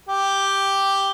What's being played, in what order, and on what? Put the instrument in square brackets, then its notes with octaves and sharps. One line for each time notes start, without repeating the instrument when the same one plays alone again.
[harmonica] G4